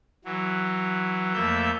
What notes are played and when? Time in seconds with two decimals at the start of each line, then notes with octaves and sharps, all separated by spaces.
0.25 E3 F#3
1.34 F2 A3 A#3 E5 G6